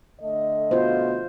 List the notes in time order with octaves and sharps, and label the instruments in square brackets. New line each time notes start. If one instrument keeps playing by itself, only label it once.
[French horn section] D3 A3 D#5
[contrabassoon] B2 [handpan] F4 C5